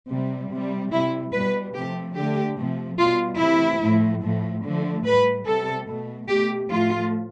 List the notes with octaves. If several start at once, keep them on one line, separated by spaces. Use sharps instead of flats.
C3 G3
C3 G3
C3 G3 E4
B2 G3 B4
C3 F3 A3 G4
D3 A3 G4
C3 F3 A3
B2 G3 F4
C3 E3 A3 E4
A2 F3 A3
A2 F3 A3
D3 F3 A3
A2 G3 B4
C3 G3 A4
B2 A3
B2 A3 G4
A2 F3 A3 F4